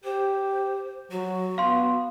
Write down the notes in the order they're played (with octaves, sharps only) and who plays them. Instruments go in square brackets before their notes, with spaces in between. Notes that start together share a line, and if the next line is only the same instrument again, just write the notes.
[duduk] G4 [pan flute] C5
[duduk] F#3 [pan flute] F#4
[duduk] B3 [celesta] F5 C6